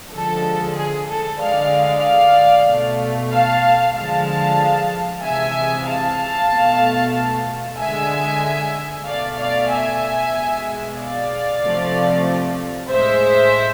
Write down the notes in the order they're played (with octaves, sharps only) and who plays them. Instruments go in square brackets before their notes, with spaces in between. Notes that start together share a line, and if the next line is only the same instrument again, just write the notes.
[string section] D3 F3 G#3 A4
G#4
A4
D3 G#3 D5 F5
B2 A3
F5 A5
D3 F3 G#3 F5 A5
C3 E3 G#3 E5 G#5
F5 A5
B2 A3
D3 G#3 E5 G#5
B2 A3 D5 F5
D5 F5
E5 G#5
B2 G#3
D5 F5
C3 F3 A3
A2 G#3 C5 E5